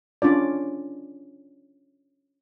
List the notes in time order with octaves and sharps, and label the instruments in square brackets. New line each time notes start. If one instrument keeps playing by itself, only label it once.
[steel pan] C#4 D4 F4 D5